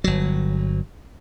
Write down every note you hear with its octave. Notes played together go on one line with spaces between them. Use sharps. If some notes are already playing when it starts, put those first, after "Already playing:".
G1 F#3